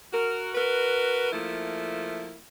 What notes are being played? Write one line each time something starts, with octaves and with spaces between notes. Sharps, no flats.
F#4 A#4
F#4 A#4 B4
F3 A3 A#3 E4